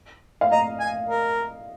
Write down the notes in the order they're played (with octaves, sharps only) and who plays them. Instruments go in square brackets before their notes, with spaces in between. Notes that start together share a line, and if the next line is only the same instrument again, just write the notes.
[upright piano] F5
[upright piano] D#5 [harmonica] A#5
[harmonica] G#5
A#4